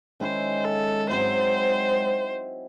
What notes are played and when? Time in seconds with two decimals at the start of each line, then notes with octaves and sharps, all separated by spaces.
0.20 D#3 G#3 C#4 E4 C5
0.64 A4
1.09 G#2 F#3 C4 E4 C5